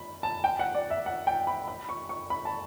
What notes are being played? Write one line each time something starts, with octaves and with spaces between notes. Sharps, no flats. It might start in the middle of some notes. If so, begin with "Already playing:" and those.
Already playing: B5
A5
G5
F#5
D5
E5
F#5
G5
B5
B5
C#6
C#6
B5
A5